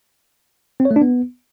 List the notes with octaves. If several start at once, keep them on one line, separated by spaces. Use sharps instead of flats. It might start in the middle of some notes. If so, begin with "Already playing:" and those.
C4
C#5
A3
D4
B3